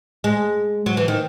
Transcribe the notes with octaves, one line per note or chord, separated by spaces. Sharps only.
G#3
F#3
E3
D#3